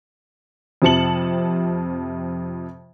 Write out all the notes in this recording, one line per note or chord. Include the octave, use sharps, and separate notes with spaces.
F2 C3 F3 A5 C#7 F#7